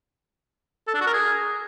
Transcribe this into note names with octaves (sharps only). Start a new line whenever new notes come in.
A4
D4
F#4
A#4
G#4